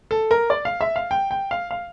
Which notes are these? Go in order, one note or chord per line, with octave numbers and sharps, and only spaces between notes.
A4
A#4
D5
F5
E5
F5
G5
G5
F5
F5